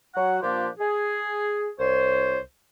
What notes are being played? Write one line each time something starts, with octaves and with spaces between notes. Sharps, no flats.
F#3 F#4 F#5
A#2 F3 A#3 D4 G4 C6
G#4
C2 C5 C#5